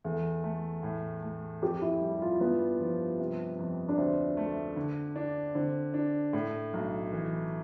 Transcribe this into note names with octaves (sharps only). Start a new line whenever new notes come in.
E2 A4
A3
A2
A3
F2 G4
E4
G3
F4
G2 B3
F3
C3
F2
D4
D2 C4
A3
D3
D4
D3 C4
D4
A2 A3
B1
E3